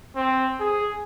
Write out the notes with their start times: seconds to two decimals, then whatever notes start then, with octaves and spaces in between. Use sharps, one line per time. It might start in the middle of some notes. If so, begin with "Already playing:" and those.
0.16 C4
0.60 G#4